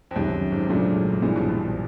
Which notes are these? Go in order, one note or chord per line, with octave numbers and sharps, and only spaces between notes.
F2
C#2 F#2 C3 D#3
G#1 G#2
A#1 A#2 C#3 F#3 A3 D4
A#1 G2 A#2 E3 G#3
B1 B2
A#1 A#2